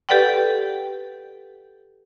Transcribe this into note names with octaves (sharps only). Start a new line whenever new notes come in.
G4 A4 B4 D5 F#5 G5